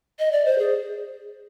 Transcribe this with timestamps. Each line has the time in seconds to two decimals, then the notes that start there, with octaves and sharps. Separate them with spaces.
0.19 D#5
0.32 D5
0.45 C5
0.58 G#4